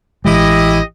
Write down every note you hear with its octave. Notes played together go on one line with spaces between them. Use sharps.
A1 E3 G#3 E4 G4 D#5